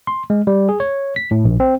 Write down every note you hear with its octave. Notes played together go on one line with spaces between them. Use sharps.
C6
G#3
G3
G#4
C#5
B6
A2
A#1
C4